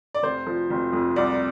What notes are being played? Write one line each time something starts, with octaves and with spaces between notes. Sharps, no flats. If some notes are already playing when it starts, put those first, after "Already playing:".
D5
F1 C5
F3
F1
F2
C2 D5